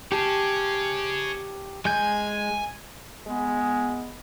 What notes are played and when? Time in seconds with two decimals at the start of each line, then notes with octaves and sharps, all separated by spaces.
0.12 G4 G#4 C#5 A5
1.85 G#3 G#5 G6
3.28 G#3 B3